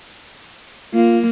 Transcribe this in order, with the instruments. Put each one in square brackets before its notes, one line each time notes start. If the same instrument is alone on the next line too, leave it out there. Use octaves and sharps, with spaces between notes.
[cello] A#3 [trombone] F4